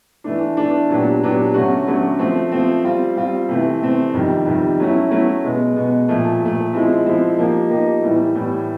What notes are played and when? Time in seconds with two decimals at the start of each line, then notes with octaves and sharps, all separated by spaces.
0.24 E3 A3 D4
0.57 E3 A3 D4
0.89 A#2 F#3 B3 D4 G4
1.22 A#2 F#3 B3 D4 G4
1.54 D3 F#3 A3 C#4 F#4
1.87 D3 F#3 A3 C#4 F#4
2.19 F3 A3 C4
2.52 F3 A3 C4
2.84 G3 C4 F4
3.17 G3 C4 F4
3.49 C3 E3 A3 C4
3.81 C3 E3 A3 C4
4.14 F2 C3 D#3 G3
4.46 F2 C3 D#3 G3
4.79 F#3 A3 C#4 E4
5.11 F#3 A3 C#4 E4
5.44 B2 G#3 B3
5.76 B2 G#3 B3
6.08 A#2 F3 A3
6.41 A#2 F3 A3
6.73 F3 G#3 C4 E4
7.06 F3 G#3 C4 E4
7.38 F3 A#3 D#4 G4
7.70 F3 A#3 D#4 G4
8.02 A2 E3 G3
8.35 A2 E3 G3